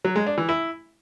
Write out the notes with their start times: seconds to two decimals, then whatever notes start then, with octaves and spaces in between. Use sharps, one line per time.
0.05 F#3
0.16 G#3
0.27 D4
0.38 E3
0.49 E4